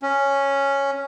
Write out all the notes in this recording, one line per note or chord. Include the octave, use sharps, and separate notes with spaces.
C#4